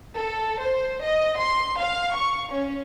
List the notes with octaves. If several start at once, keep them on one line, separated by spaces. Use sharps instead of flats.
A4
C5
D#5
C6
F5
C#6
C#4